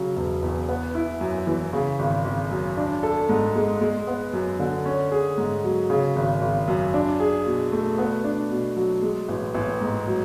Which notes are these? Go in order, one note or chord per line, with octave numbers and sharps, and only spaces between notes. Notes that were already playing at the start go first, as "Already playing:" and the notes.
Already playing: C#3 F#3
E1
E2
B3
E4
F#2
E3
C#3
G#1
G#1
F#2
D4
A4
G#2
G#3
G#3
B3
F#2
D3
C#4
G#4
G#2
F#3
C#3
G#1
G#1
F#2
D4
G#4
B2
A3
B3
D4
B2
F#3
G#3
A1
A1
G#2
F#3